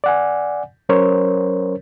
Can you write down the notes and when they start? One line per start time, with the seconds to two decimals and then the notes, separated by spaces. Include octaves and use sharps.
0.04 D5 F#5 G#5
0.89 F#3 C#4 A#4 C5 C#5